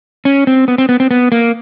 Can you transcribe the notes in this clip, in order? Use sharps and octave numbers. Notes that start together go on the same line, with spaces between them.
C#4
C4
B3
C4
B3
C4
B3
A#3